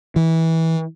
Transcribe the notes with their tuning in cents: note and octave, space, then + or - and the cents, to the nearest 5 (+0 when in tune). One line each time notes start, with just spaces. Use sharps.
E3 -20